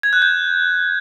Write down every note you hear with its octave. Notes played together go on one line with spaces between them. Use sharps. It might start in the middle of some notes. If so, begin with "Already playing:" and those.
G#6
F#6
G6